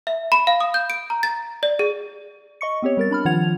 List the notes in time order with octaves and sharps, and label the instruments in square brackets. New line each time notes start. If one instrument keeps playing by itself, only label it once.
[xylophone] E5
B5
F5
D#6
G6
D7
A#5
A6
D5
G#4
[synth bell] D#5 C#6 C#7
B3 C4 G4 C#5
G3 A#4 A6
D4 B5 F6
D#3 F3 F4 F#5 G#6 F7